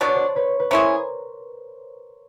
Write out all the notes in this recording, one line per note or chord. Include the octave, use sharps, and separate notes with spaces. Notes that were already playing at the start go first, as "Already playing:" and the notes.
B2 F#3 B3 D4 D5
C#5
C5 D5
B4 C#5
B4
G#3 C#4 E4 G#4 A#4 C5